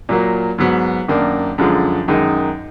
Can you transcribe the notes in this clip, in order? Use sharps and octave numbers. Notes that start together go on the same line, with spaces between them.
A#2 F#3 A#3
G#2 F#3 B3
F#2 D#3 A#3 D4
F#2 D3 F3 G#3
F#2 D#3 G#3 D#4